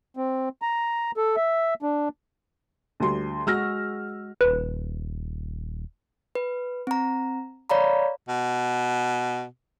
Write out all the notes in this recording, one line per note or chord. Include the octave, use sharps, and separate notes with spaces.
C4
A#5
A4
E5
D4
D2 G3 C6
G#3 F#4 E6 F6 A#6
D#1 B4
B4
C4 A#5
C#5 D5 F5 A#5 B5
B2